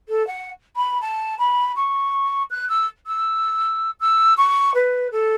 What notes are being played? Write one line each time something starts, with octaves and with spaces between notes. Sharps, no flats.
A4
F#5
B5
A5
B5
C#6
F#6
E6
E6
E6
C#6
B4
A4